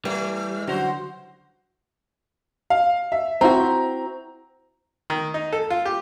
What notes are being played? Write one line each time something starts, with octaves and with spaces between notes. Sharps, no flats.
E3 G3 A3
D3 F#3 F#4 C5 F7
F5
E5
C4 E4 F#4 A#5
D#3
D#4
A4
F4
G4